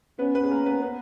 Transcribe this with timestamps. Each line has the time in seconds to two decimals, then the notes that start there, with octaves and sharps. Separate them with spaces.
0.19 B3 C#4 B4
0.35 B3 B4
0.43 G#4
0.51 A#3 A#4
0.66 B3 B4
0.81 B3 B4